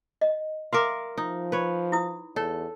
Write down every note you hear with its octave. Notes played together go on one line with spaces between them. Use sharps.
D#5
A#4 E5 F5 C6 D6
F3 D#4
B4 C#5
E4 D#6
E2 A4 C#5